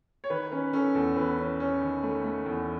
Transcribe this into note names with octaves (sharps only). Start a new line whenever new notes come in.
C#5
D#3 B4
C#4 B4
C#4 A4
E2 A4
E2 B4
C#4
C#4
D#3
A3
A3
E2